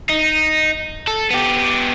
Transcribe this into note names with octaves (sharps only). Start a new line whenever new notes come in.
D#4
A4
B3 G4